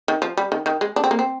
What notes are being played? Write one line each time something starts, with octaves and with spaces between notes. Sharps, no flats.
D#3
F3
G3
D#3
D#3
G#3
D4
C4
A#3
C4